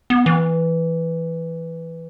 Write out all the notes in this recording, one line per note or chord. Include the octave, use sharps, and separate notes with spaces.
B3
E3